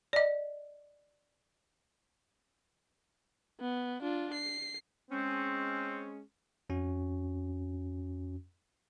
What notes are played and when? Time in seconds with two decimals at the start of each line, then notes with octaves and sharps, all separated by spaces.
0.13 D5 D#5
3.60 B3
4.02 D4 F4
4.33 C7
5.11 G#3 C4 C#4
6.69 F2 C#4 F#4